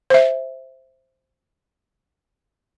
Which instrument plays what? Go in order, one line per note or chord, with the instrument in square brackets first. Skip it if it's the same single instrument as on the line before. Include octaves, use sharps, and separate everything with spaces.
[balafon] C5 E5